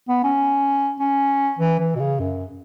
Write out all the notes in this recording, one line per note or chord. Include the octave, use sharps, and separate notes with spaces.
B3
C#4
C#4
E3
E3
B2
C#3
F#2